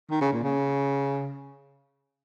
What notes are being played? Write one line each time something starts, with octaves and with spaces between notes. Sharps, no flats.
D#3
C#3
A#2
C#3